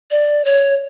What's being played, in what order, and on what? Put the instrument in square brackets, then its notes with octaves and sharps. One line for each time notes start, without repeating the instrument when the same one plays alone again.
[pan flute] D5
C#5